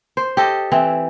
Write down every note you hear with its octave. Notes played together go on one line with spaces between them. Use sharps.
C5
G4 A4 D#5
E3 C4 E4